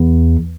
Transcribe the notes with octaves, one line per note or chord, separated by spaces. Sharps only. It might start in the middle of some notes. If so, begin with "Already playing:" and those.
Already playing: E2